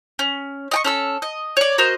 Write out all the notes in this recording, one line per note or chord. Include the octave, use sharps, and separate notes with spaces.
C#4
D#5 G5 C#6
C#4 A4 E6
D#5
C#5 D5
F#4 A#4 C5 D#5